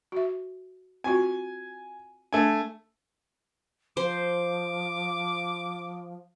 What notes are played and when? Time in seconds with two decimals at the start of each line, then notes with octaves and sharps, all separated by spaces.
0.12 F#4 E5
1.04 C4 F4 F#4 G#5
2.33 A3 D4 G#5
3.97 F3 C5 D6